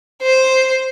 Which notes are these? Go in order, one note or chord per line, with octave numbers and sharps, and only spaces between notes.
C5